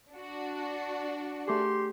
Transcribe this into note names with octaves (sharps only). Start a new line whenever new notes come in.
D4 F#4
A3 G4 G#4 C6